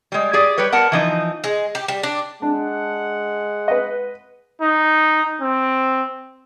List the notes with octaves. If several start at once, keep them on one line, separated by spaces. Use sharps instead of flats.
G3 G#3
G4 G#4 D5
G3 G4 B4 C#5
B3 A#4 F#5 A5
E3 F3 D#4
G#3
G4
G3
D4
G#3 D4 F#5
B4 D#5
D#4
C4